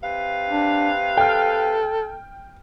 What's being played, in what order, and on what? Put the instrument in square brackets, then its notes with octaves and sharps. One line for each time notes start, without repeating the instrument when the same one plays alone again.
[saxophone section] C3 B4 F5
[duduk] D4
[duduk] A4 [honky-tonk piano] G5 F6